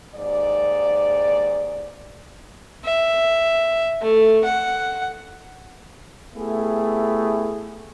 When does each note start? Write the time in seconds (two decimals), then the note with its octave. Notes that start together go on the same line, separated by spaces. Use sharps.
0.15 D#2 G#2 D5
2.85 E5
4.02 A3
4.44 F#5
6.35 A3 B3 E4 G4 G#4